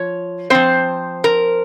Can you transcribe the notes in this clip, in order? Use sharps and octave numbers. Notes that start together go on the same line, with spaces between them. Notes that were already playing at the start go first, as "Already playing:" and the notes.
Already playing: F3 C#5
F3 C4 C5
A#4